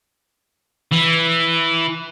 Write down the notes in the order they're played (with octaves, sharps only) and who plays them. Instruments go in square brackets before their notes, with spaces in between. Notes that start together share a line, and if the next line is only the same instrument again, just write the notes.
[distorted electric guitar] E3